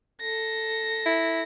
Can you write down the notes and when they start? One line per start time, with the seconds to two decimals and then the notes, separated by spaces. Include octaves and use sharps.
0.21 A4 A#6
1.06 E4